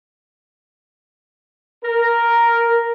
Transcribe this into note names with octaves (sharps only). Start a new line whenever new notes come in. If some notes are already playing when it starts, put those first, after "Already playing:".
A#4